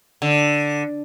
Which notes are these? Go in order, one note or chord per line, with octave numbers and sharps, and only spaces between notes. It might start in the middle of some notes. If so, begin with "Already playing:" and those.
D3